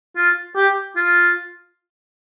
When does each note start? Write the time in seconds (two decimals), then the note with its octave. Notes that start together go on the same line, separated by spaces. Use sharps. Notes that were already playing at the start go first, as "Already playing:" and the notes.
0.17 F4
0.56 G4
0.96 F4